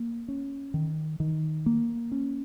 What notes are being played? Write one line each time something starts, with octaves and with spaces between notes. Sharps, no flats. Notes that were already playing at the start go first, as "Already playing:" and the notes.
Already playing: A#3
C#4
D#3
D#3
A#3
C#4